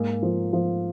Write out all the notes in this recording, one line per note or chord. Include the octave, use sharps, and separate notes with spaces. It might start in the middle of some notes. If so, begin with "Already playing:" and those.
Already playing: G#2 A#3
F3
F3